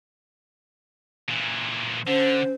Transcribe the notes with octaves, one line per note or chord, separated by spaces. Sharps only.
A#2 E3
D3 C#4 C5